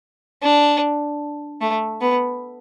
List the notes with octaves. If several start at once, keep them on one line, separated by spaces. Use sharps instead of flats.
D4
A3
B3